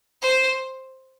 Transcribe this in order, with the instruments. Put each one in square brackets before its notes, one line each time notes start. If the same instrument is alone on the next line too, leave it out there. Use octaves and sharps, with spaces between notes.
[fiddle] C5